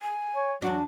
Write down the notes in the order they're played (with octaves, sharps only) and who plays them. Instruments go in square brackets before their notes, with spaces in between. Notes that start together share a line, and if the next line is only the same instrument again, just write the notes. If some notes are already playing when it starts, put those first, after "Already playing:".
[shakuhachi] G#5
[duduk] C#5
[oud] E2 D4 [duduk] F#3 [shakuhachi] F#4